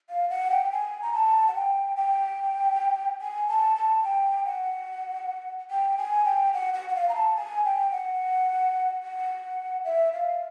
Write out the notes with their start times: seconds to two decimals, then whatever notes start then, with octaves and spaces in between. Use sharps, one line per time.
0.10 F5
0.30 F#5
0.51 G5
0.72 G#5
1.02 A#5
1.13 A5
1.48 F#5
1.55 G5
1.96 G5
3.21 G#5
3.48 A5
3.76 A5
4.04 G5
4.45 F#5
5.71 G5
5.98 G#5
6.25 G5
6.54 F#5
6.74 F#5
6.89 F#5
6.95 F5
7.09 A#5
7.15 A5
7.36 G#5
7.64 G5
7.91 F#5
9.03 F#5
9.85 E5
10.13 F5